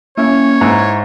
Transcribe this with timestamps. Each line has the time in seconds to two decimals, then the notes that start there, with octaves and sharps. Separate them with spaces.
0.17 A#3 C#4 E4 C#5
0.61 G#2 E4 B4 A#5